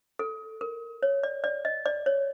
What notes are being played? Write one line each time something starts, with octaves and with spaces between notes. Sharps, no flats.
A4
A#4
C#5
D5
D5
D#5
D5
C#5